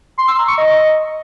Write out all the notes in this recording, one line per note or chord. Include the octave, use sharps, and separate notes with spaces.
C6
E6
A#5
C#6
D#5